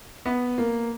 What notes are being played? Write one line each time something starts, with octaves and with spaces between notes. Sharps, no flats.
B3
A#3